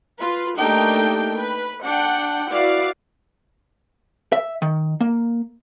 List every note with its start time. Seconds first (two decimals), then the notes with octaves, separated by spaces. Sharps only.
0.20 F4 B4
0.56 A3 A#3 D4 D#4 G4 G5
1.36 B4
1.84 D4 F#5 G5
2.51 E4 F#4 B4 D5 F5
4.32 E5
4.62 D#3
5.01 A#3